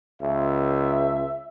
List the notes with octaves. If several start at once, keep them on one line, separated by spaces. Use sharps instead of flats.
C#2 E5